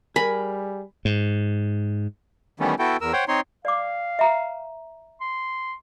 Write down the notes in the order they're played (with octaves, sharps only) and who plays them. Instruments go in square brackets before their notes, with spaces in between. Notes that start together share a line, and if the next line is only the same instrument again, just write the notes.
[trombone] G3 [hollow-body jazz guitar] G#4 [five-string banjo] A#4 [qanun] B5
[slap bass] G#2
[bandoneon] D#3 E3 G3 A3 B3 C#4
B3 E4 F#4 A4 G5
E2 A#4 E6
C5 C#5 F#5 G5
C4 D#4 C#5 C6
[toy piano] D5 D6 [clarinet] F5
[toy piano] E5 A#5
[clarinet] C6